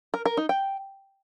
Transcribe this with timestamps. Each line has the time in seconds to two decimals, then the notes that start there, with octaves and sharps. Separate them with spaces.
0.14 A#4
0.25 A#4
0.37 D#4
0.49 G5